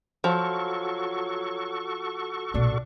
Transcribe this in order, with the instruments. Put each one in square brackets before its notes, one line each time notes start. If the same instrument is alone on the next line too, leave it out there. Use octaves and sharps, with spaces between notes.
[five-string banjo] F3 [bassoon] F#3 [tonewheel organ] F#4 A4 C#6
[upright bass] B1 A#2 [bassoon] D4